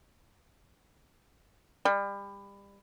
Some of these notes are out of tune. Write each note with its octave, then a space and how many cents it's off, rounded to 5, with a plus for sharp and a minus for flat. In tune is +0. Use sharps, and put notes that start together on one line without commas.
G3 +30